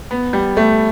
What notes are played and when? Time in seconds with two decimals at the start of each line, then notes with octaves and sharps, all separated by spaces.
0.11 B3
0.33 G3
0.57 A3